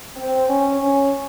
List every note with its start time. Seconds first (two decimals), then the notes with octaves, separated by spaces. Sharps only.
0.16 C4
0.48 C#4
0.79 C#4